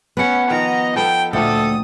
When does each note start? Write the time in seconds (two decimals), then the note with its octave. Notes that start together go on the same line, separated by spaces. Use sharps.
0.17 B3 C#4 B4 F#5
0.50 D#3 F3 D#5 A#5
0.96 F3 B3 D#4 A4 G5
1.33 D2 A#2 A4 G5 D#6